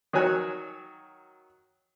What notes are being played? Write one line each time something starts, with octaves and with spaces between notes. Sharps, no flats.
D#3 F#3 F#4 C#5 G#5 F#6